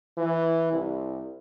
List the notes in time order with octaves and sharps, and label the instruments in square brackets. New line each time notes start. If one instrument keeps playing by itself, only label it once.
[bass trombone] E3
C2